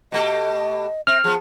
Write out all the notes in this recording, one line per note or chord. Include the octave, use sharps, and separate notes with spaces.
B2 A3 G4 D#5
C4 E5 F6
F3 B3 G#4